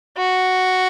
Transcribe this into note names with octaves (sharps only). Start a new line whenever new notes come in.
F#4